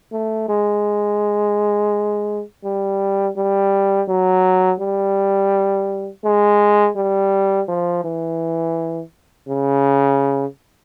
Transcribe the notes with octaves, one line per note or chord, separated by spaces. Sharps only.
A3
G#3
G3
G3
F#3
G3
G#3
G3
F3
E3
C#3